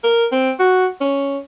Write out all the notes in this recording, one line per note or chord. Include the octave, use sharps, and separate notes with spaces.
A#4
C4
F#4
C#4